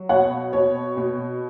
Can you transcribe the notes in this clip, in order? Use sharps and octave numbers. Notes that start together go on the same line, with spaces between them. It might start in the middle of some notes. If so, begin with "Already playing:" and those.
Already playing: F#3
B2 C#5 F#5
B2 C#5
B2